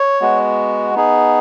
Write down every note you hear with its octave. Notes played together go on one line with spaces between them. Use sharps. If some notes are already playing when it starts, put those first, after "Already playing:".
Already playing: C#5
G#3 B3 F#4
B3 D#4 G#4